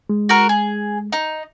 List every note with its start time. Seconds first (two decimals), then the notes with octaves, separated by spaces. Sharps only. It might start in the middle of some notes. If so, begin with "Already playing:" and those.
0.09 G#3
0.29 F#4 A#4
0.49 G#4
1.12 D#4